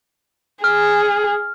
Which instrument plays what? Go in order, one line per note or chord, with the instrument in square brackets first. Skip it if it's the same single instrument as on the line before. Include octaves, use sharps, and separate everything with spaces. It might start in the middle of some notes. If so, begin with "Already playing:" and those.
[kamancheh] G#4 [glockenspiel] F6